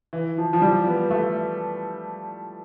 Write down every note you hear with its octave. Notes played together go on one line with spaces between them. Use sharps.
E3
F3
F3
G3
B3
A3